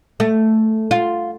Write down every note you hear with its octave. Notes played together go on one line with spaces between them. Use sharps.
A3
F4